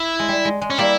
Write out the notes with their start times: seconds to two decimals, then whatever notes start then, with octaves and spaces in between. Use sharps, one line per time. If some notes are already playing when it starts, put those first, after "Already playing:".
Already playing: E4
0.19 G#3
0.28 G3
0.45 G#3
0.62 G#3
0.70 C#4
0.78 G3 A#3 E4